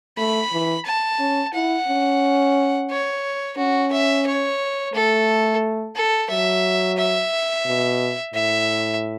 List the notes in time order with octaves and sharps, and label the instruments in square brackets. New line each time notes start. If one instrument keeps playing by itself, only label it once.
[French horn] A3 [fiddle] B5
[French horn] E3
[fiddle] A5
[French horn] C#4
[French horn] E4 [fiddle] F#5
[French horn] C#4
[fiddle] C#5
[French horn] C#4 [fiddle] F#4
[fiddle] E5
C#5
[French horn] A3 [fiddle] A4
[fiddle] A4
[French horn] F#3 [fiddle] E5
[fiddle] E5
[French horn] B2
[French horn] A2 [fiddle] E5